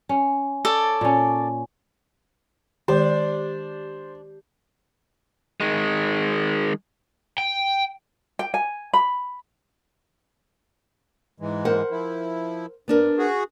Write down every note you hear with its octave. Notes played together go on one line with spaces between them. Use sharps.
C#4
A4 C#5 D5
A#2 C#4
D#3 G#3 D4 G4 C5
D#3 G#3
G5
G5
G#5
B5
G#2 E3 G#3
A#4 C5 F#5
F3 E4
G2 B3 D4 A#4
F#4 G#4